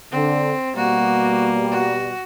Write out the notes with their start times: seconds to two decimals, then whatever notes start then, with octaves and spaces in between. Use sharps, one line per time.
0.12 D3 C4
0.76 B2 G3 A#3 F#4
1.71 F#4